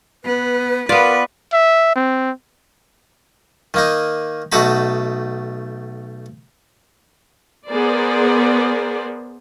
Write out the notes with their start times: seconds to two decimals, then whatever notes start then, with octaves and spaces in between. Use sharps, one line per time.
0.24 B3 B4
0.89 B3 F4 A#4 B4 D5
1.53 E5
1.96 C4
3.74 D#3 A#3 D#4
4.52 B1 A3 D#4 F#4 A5 B5
7.68 B3 G#4 A#4 C5 D5